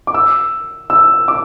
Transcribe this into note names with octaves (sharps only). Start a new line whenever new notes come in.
D6
E6
E6
D6